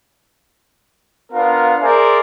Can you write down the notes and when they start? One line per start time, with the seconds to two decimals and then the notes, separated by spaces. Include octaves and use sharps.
1.32 B3 D4 F4 A#4 F5
1.81 G#4 A#4 C5 D5 E5 G#5